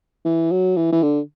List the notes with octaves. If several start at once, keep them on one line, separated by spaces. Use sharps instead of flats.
E3
F#3
E3
E3
D3